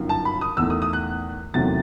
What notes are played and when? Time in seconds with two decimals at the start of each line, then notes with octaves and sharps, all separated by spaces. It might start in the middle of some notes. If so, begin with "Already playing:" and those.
Already playing: G1 F#2 D#3
0.09 A5
0.25 B5
0.41 D#6
0.57 E2 D#3 A3 E6
0.70 D#6
0.82 D#6
0.93 F#6
1.54 E2 C3 D#3 F#3 A3 A6